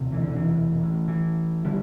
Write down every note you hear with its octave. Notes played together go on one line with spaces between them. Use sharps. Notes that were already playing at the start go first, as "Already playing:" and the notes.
Already playing: E1 D2 C3
E3
D3
E3
A1 A2
E3
D3 G3